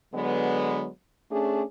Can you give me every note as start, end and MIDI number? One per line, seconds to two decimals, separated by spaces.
0.14 0.87 50
0.14 0.87 54
0.14 0.87 56
0.14 0.87 59
1.31 1.63 57
1.31 1.63 61
1.31 1.63 62
1.31 1.63 68